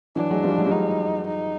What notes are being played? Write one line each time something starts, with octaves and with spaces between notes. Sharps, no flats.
E3 F#3 D4
F#3 G#3
F3 G3
F#3 G#3
G3
F#3 G#3 D#4
D#4